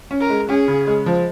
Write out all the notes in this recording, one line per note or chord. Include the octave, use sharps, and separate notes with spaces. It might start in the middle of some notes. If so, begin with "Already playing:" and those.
C#4
A#4
G#3
C#4 G#4
C#3
G#3
F3